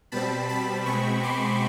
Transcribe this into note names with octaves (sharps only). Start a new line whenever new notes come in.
B2 G3 C4 A5 B5
A5 B5
B2 G#3 C4 B5 C#6
C6 D6